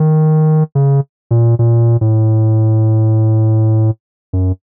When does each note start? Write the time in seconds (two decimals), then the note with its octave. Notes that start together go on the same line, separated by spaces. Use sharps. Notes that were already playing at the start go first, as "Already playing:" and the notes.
Already playing: D#3
0.75 C#3
1.31 A#2
1.59 A#2
2.01 A2
4.33 F#2